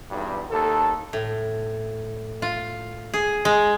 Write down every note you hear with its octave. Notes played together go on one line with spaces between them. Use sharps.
B1 E2 G2
D#2 A4
A2
F4
G#4
G#3